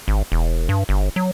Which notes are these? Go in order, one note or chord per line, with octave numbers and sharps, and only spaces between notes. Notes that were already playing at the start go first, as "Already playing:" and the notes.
G#1
E1
G2
G1
F#3